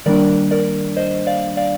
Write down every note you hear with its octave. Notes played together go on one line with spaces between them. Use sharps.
D#3 G3 A#3 D4 A#4 D5
A#4 D5
C5 D#5
D5 F5
D5 F5